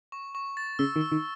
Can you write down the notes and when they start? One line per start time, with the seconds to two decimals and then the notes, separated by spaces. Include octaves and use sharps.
0.12 C#6
0.35 C#6
0.57 A6
0.79 C#3 E6
0.96 D#3
1.01 E6
1.12 D#3